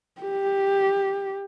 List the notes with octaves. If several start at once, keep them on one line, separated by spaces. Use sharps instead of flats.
G4